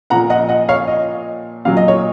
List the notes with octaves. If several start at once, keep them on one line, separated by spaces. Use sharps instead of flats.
A#2 F3 F#5 A#5
D#5 F#5
D#5 F#5
C#5 F5
D#5
A#2 F#3 F5
D#5
C#5